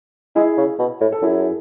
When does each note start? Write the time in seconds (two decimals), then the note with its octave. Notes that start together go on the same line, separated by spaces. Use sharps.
0.35 G#3 E4 G#4
0.58 C#3
0.79 B2
1.01 A2
1.12 A4
1.22 F#2 E4 G#4